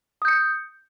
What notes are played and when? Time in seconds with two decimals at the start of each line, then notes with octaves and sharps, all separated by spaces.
0.22 D#6
0.25 G6
0.28 C#7